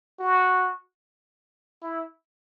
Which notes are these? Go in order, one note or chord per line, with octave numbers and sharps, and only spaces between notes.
F#4
E4